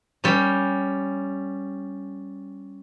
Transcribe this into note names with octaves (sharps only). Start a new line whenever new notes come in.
G3 C#4